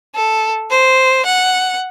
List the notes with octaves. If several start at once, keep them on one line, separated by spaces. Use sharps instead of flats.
A4
C5
F#5